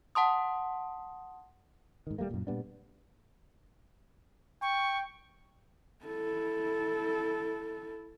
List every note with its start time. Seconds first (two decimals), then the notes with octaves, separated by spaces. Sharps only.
0.15 F#5 A5 C6 D#6
2.07 G#2 D#3
2.18 D#1 G3 A3 A#3
2.30 F#2 A#2
2.47 A#2 G3 B3 D4
4.62 G5 C#6
6.05 E4 A4